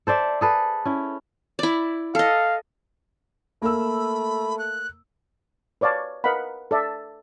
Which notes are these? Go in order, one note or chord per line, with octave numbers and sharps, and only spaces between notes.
A4 C5 D5 E5
G#4 A4 B4
C#4 E4
E4 D5
A4 D#5 F5
A3 A#3 B5 E6
F#6
B4 C#5 D5 F5 A5
A#4 B4 D#5 F5 F#5 B5
A4 D5 E5